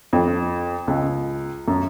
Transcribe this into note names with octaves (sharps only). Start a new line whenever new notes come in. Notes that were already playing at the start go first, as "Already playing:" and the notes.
F2
C#2
F#2